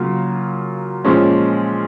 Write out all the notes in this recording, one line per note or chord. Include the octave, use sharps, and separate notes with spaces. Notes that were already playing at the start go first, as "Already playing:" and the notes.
Already playing: C#3 F#3 A#3 F4
A#2 F3 G#3 C#4